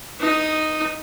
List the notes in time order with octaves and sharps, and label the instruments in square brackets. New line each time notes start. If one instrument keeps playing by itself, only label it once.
[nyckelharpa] D#4 D#6